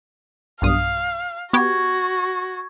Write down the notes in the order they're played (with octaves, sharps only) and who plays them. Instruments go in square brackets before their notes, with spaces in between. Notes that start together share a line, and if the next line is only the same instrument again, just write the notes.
[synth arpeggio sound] B1 G2 D#6 [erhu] F5
[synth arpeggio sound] B3 G4 [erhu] F#4 [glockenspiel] C#6 G#6